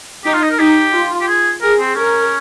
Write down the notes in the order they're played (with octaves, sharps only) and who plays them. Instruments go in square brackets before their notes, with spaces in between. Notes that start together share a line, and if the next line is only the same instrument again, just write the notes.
[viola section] D#4 [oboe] G4
[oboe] F4
D#4
A#4
[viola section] D#4 [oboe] G4
[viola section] F4
[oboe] G4
G#4
[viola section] G#4 [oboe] A#4
[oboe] C4
[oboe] C#4 [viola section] A#4